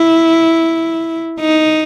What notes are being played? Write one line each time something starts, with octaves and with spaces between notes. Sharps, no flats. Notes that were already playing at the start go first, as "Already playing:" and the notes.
Already playing: E4
D#4